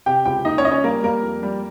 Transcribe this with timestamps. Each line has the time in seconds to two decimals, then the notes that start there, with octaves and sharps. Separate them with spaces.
0.06 C3 G4 G5
0.25 C#2 G4 G5
0.45 A#3 D#4 D#5
0.58 C#4 C#5
0.64 C#2 D#5
0.71 C#4 C#5
0.84 G3 A#3 A#4
1.03 G3 A#3 A#4
1.23 F2
1.43 G3